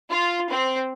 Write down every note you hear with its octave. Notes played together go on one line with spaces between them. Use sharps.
F4
C4